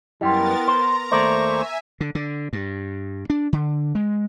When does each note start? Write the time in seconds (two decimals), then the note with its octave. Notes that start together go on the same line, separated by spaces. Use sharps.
0.21 F#2 G3 B3 E4 A#4 G5 C6 A6
0.68 C5 A#5 C6
1.12 D#2 A3 A#4 C5 D5 C#6
1.44 E5 G#5
2.01 D3
2.15 D3
2.53 G2
3.30 D4
3.53 D3
3.95 G#3